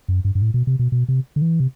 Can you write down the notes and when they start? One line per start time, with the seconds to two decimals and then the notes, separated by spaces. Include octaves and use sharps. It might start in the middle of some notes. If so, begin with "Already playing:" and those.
0.08 F#2
0.25 G2
0.35 G2
0.42 A2
0.54 B2
0.67 C3
0.79 B2
0.92 B2
1.08 C3
1.36 D3
1.42 E3
1.60 C3